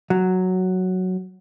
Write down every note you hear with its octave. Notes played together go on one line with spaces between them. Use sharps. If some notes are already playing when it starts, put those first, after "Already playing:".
F#3